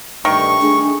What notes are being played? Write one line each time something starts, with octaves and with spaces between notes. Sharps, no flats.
G2 D3 D#3 A3 C#6
A3 D4 G#4